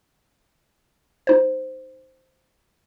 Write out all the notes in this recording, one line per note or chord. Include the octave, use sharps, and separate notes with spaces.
D#4 C5